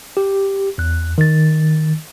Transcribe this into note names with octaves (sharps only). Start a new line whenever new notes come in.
G4
E2 F#6
D#3 A6